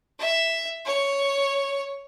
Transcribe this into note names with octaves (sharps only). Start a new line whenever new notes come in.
E5
C#5